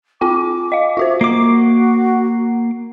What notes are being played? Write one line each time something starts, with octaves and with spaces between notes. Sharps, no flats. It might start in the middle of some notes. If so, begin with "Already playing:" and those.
C4 F4 G5 D6
D#5 F5
F4 F#4 C5 E5
A#3 F#4 D6 C7